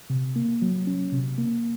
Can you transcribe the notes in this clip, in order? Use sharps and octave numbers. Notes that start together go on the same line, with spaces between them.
C3
A#3
F#3
C#4
C3
A#3